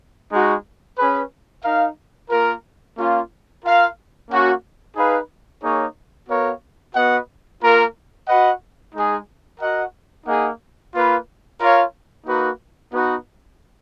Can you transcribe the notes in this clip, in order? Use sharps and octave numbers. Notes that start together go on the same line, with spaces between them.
G#3 D#4 F#4
C#4 G#4 B4
D#4 A#4 F5
A#3 F4 A#4
A#3 C#4 F4
F4 A#4 F5
A#3 C#4 F#4
D#4 G#4 B4 F5
A#3 D#4 G#4 C#5
B3 F#4 A#4 C#5 F5
B3 F#4 B4 D#5 F#5
A#3 F4 A#4
F#4 B4 D#5 F#5
G#3 D#4 G#4
F#4 A#4 D#5 F#5
A#3 D#4 G#4 D#5 F#5
A#3 F4 B4
F4 A#4 C#5 F5
A#3 D#4 F#4 B4 F#5
B3 D#4 F#4 B4 F#5